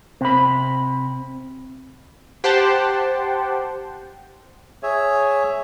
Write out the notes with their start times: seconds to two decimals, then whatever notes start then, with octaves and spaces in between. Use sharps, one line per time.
0.21 C3 C4 B5
2.44 G4 C5 F#5 G5 A5 C6
4.83 G#4 C#5 E5